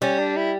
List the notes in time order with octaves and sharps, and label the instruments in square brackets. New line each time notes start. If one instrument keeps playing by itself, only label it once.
[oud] G3 [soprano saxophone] C#4
[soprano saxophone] D4
E4